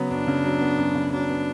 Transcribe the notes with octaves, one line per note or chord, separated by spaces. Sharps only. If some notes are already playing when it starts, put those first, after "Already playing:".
Already playing: C#3 F#3 B3
F#2 D4
C#3
F#3
B3
F#2
C#3
F#3 D4
B3